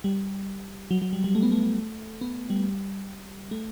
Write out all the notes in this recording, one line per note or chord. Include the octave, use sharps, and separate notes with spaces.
G3
F#3
F#3
G3
G3
A3
B3
A3
B3
G3
A3